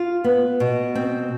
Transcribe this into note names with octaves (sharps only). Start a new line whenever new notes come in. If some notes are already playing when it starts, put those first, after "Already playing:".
Already playing: F4
B3
B2
C4